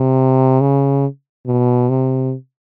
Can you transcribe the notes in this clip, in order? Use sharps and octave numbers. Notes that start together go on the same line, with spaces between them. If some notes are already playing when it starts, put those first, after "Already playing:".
Already playing: C3
C#3
B2
C3